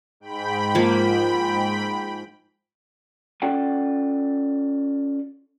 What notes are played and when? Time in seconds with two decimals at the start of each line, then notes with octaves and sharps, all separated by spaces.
0.20 G#2 G5 B5
0.75 F3 A#3
3.42 C#4 F4 A4 D5 F#5 G5